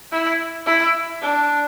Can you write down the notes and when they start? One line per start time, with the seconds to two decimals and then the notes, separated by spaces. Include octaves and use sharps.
0.12 E4
0.66 E4
1.21 D4